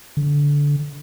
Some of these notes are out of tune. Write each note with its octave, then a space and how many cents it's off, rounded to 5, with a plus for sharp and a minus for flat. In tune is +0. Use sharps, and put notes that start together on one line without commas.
D3 -20